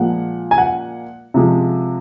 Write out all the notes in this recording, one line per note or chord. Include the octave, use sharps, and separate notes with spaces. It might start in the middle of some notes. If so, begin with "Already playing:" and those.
Already playing: A#2 F3 G#3 F#5
G#5
F#5
C3 F3 G#3